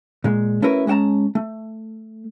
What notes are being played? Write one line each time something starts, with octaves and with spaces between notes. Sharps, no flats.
A#2 G#3
A3 C#4 E4 F#4 A#4 B4
G#3 C#4 F#5 A5 A#5
A3